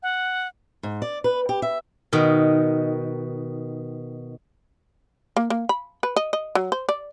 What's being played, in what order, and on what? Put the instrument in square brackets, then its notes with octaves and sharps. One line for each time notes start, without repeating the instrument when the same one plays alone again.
[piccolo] F#5
[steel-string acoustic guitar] G#2
D5
B4
G4
E5
[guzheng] B2 D#3
[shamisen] A#3
A#3
B5
B4
D#5
D#5
F#3
C5
D5